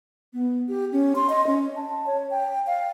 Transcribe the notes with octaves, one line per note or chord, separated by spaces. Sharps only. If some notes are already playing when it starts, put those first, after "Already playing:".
B3
G4
C#4
C6
D#5
C#4
A5
C#5
G5
F5